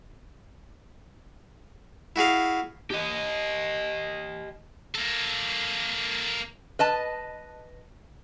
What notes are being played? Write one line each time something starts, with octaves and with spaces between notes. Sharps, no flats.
E4 F#4 G#4 F5
G4 D#5
A#3 A4
B4 D#5 A5